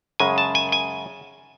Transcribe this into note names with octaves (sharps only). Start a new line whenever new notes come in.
F#2 C#3 G#3 G#5
A5
G#5
G#5